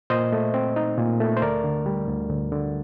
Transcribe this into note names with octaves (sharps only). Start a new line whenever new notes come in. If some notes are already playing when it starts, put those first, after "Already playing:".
A#2 C5 D#5
A3
C4
D#4
A#2
A3
C5
D2 A#4 D5
D3
G3
D2
D2
D3